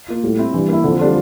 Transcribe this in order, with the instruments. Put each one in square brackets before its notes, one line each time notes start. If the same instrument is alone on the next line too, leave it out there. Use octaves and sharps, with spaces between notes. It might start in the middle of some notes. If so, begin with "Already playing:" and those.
[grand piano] A#3 F4
[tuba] A2 [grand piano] G3
[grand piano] C4 E4
[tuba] G2 [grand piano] E3
[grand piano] A#3 E4
[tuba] F2 [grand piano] D3
[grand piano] G3 D4 F4